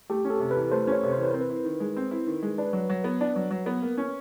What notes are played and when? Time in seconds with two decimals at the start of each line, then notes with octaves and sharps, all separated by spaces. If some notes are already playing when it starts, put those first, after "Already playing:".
0.10 A3 G4
0.25 C#4
0.30 A4
0.40 C3
0.51 B4
0.56 E3
0.72 A3 C5
0.87 C#4
0.92 C#5
1.03 C3
1.13 C5
1.18 E3 B4
1.31 C4 A#4
1.41 B4
1.50 E4
1.65 D#3
1.80 G#3
1.97 C4
2.11 E4
2.26 D#3
2.43 G#3
2.58 D4 B4
2.73 F#3
2.90 F#3
3.04 B3
3.21 D4
3.36 F#3
3.51 F#3
3.66 B3
3.82 A#3
3.98 C#4